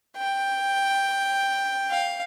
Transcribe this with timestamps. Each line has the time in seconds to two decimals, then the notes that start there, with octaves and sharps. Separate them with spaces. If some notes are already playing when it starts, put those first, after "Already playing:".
0.18 G5
1.91 F5